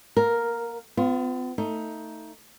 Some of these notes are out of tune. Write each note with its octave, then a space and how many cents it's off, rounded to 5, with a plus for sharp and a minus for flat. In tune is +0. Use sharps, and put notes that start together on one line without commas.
A#3 +25 A#4 +0
B3 +45 F4 +0
A3 +25 D#4 +15